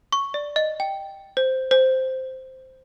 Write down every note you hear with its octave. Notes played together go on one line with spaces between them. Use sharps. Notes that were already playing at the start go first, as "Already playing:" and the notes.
C#6
D5
D#5
G5
C5
C5